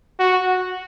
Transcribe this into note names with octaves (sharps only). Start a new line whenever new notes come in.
F#4